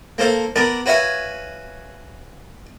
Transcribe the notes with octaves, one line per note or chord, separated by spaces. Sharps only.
A#3 A4 C5 F5
B3 A#4 D5 A5
F#4 B4 C#5 E5 F5 G#5